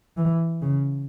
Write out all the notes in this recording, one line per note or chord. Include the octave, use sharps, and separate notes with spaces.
E3
C#3